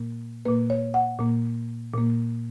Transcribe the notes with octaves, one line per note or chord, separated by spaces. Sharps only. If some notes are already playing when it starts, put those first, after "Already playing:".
Already playing: A#2 A#3
A#2 A#3 B4
C#5
F#5
A#2 A#3
A#2 A#3